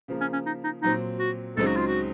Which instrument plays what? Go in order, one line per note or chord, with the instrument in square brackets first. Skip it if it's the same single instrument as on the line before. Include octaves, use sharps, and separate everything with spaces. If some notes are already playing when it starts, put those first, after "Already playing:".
[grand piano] C#3 F3 A#3
[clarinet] C#4
C#4
D#4
D#4
[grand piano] A#2 F#3 C4 [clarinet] D#4
[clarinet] F#4
[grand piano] C#2 C#3 F#3 C4 D#4 [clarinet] A4
[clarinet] F#4
F4
F#4